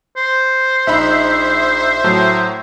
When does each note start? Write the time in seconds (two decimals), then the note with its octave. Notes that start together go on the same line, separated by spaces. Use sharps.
0.17 C5
0.87 A#1 D#4 E5 B5
2.04 A2 F#3 A5